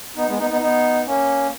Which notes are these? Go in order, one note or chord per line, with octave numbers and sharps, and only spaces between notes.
B3 D#4
G#3 B3
B3 D#4
B3 D#4
B3 D#4
A#3 C#4